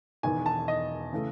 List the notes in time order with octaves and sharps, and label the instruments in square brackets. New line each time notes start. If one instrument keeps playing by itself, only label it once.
[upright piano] E1 E2 D#3 G#5
A5
D#5
C#3 E3 A3